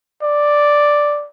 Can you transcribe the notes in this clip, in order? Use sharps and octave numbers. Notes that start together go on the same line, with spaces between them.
D5